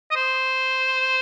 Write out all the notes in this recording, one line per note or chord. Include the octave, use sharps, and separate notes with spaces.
D#5
C5